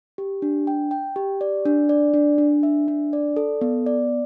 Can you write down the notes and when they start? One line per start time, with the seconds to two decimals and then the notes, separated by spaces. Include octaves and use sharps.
0.18 G4
0.42 D4
0.67 G5
0.91 G5
1.16 G4
1.41 D5
1.66 D4
1.89 D5
2.14 D4
2.38 D4
2.63 E5
2.88 D4
3.13 D5
3.36 A4
3.61 B3
3.86 D5